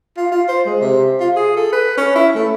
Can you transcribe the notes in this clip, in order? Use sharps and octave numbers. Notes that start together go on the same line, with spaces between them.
F4
F4
C5
G#3
C3
F4
G#4
A4
B4
C#4
E4
A3